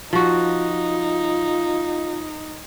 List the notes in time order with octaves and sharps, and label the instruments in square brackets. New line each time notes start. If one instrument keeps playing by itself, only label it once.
[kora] F3 F#4 [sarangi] D#4 [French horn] F4